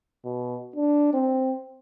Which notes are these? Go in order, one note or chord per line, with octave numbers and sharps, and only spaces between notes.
B2
D4
C4